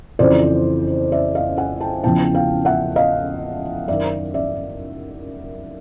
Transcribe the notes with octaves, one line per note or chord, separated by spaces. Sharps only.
F2 C#3 E3 C5 D5
D5 E5
D#5 F5
F#5 G#5
G5 A5
E2 C#3 F3 G5 A5
F5 G5
E5 F#5
D#5 F5
F#2 D#3 D5 E5
D5 E5